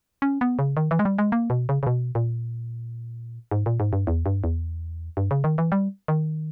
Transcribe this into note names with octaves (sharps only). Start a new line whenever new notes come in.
C#4
B3
C#3
D#3
E3
G#3
G3
G#3
A#3
B2
C#3
C#3
B2
A#2
G#2
A#2
G#2
G2
E2
G2
E2
G2
C#3
D#3
E3
G3
D#3